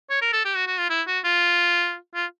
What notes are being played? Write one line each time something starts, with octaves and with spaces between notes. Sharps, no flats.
C#5
A#4
A4
G4
F#4
F#4
F4
E4
F#4
F4
F4